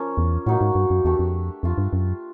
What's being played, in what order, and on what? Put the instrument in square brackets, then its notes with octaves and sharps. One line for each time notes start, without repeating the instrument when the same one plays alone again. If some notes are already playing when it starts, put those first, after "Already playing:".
Already playing: [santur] F3 A#3 C#4 F4
[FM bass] E2
[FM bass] A2 [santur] F#3 A#3 D#4 F#4
[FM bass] G#2
G2
F#2
[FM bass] E2 [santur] A3 D4 G4
[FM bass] F2
[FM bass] F2 [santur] A3 D4 F4
[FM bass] G2
F#2